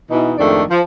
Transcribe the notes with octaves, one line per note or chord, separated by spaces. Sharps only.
B2 E3 D#4
F2 G#2 D#3 A3 D4 D5
F3